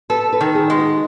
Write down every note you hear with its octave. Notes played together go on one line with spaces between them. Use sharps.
A4 B4
B4
D#3
G#4
G#3
F#4